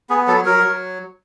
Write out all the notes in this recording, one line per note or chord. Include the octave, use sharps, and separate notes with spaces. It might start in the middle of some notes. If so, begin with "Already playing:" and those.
B3 G#4
F#3 A4
F#3 A#4
F#3